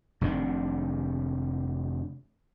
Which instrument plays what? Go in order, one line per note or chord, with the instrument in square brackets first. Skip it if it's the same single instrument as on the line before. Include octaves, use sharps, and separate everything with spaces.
[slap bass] F1 C3 D#3 D4